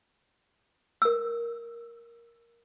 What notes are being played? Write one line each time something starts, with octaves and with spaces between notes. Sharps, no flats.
A#4 E6